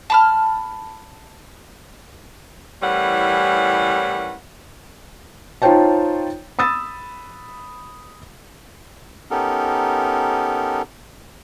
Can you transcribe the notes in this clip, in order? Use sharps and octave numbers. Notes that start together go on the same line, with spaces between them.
A5 B5 F6
A2 E3 G3 C#4 A#4 F#5
D#4 F4 C5 C#5 G5 A5
B5 D#6 E6 A6
B3 C#4 D#4 G4 A4 A#4